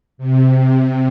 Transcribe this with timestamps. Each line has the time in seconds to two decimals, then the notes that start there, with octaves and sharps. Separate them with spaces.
0.18 C3
0.57 C3